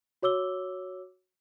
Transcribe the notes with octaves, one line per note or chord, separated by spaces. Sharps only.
F#4 C#5 D6 E6 G7